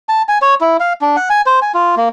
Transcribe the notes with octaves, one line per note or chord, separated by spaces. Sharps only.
A5
G#5
C#5
E4
F5
D4
F#5
G#5
C5
G#5
F4
A#3